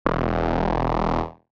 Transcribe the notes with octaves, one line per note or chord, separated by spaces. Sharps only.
E1